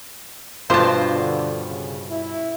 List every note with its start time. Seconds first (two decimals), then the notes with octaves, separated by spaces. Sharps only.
0.70 G2 B2 F4 B4 C5 A5
1.13 D3
1.68 C#3
2.11 E4